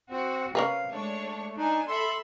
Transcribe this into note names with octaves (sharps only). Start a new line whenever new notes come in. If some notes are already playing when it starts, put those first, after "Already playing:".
C4 F#4
C3 C#4 A#4 B4 F5
G#3 A3 D4 C#5
D4 D#4 G#5
A4 E5 B5 C6